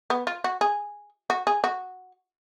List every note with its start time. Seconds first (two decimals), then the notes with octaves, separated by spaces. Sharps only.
0.10 B3
0.27 F4
0.44 F#4
0.61 G#4
1.30 F#4
1.47 G#4
1.64 F#4